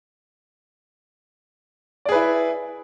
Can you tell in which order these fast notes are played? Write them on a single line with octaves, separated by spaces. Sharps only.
D5 G#4 B4 E4